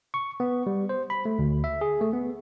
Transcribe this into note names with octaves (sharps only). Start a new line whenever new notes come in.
C#6
B3
G3
C5
B5
A3
D2
E5
G#4
A3
B3